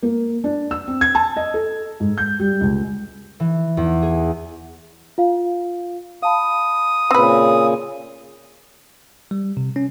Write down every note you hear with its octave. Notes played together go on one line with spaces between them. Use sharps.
A#3
D4
E6
C4
G#6
A5
D#5
A4
G#2
G6
G3
C#2
E3
E2
G#4
F4 F5
F5 A5 B5 D#6
A#2 C#3 C4 B4
G3
C3
C#4